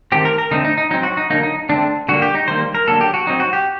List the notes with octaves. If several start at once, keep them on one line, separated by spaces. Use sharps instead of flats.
D#3 A3 C4 G4
A#4
A#4
D3 A3 C4 D#4
D#4
D#4
F#3 C4 D#4
F#4
D#4
D3 F#3 A#3 D#4
D#4
D3 A3 C4 D4
D3 G3 A#3 F#4
G4
D#4
D#3 G3 A#3 C5
A#4
D3 F#3 A#3 A4
G4
F#4
F#3 C4 D#4
F#4
G4